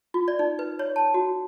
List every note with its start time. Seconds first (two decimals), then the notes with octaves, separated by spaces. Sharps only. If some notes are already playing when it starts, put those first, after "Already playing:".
0.14 F4
0.28 D5
0.39 D#4
0.59 B4
0.79 C#5
0.96 A5
1.14 F#4